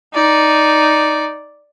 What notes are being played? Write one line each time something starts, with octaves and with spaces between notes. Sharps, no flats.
D#4 D5